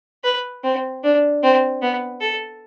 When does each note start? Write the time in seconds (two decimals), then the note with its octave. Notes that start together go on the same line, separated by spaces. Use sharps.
0.24 B4
0.64 C4
1.03 D4
1.43 C4
1.82 B3
2.21 A4